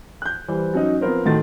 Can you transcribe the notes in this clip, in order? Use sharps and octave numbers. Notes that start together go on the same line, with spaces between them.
F#6 G6
E3 G3 C5
F#3 C#4 D#4
F3 B3 C4 A#4 C5
A2 D#3 A3 F#4 C6 A6